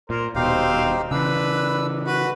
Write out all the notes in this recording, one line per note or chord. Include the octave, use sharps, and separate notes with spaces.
A#2 A#4 C5
D#1 B2 C4 D#4 G4 C5 F5
C#3 E3 D4 B4 E6
F#4 B4